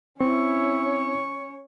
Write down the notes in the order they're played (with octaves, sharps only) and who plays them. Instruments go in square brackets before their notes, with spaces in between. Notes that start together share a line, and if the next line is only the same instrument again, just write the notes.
[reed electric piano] C4 [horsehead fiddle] C#4 C#5 [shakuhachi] E4 [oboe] C#6